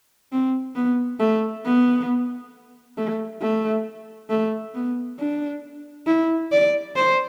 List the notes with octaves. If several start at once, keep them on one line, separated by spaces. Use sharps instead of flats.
C4
B3
A3
B3
A3
A3
A3
B3
D4
E4
D5
C5